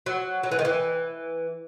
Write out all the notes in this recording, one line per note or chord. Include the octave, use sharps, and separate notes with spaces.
F#3
F#3
E3
D#3
E3